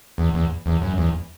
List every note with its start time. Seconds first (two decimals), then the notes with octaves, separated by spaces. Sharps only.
0.18 E2
0.34 E2
0.66 E2
0.82 F#2
0.98 E2